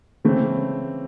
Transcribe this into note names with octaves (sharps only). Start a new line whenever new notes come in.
C#3 E3 A3 C4